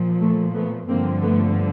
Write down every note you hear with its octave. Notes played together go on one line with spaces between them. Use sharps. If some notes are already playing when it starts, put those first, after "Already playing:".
Already playing: A#2 F3
A3
A3 B3
G2 D3 F3 A#3 C4
A3 B3